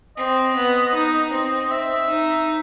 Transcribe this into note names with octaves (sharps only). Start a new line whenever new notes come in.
C4 D#5
B3
D#4
C4
E5
D#4